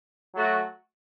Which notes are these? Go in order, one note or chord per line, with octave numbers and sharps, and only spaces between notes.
F#3 A3 F#4